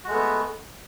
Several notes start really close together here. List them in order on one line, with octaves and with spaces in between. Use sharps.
F#4 G#3 A3 B3